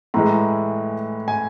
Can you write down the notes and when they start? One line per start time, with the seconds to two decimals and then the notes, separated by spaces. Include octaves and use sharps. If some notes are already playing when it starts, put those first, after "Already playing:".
0.14 A2 E3 G#3 A#5
1.28 G#5